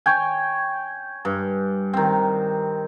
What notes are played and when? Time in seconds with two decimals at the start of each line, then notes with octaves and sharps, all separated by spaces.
0.06 C#5 G5 G#5
1.25 G2
1.93 D#3 C4